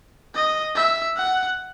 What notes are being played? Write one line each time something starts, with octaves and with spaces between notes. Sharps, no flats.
D#5
E5
F#5